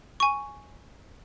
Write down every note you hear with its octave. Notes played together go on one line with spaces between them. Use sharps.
G#5 C#6